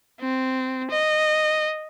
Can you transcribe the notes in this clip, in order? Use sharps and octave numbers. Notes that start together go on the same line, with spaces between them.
C4
D#5